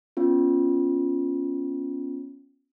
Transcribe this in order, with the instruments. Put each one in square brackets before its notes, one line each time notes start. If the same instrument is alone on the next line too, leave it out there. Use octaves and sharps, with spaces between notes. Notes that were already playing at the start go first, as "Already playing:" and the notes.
[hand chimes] B3 C#4 F4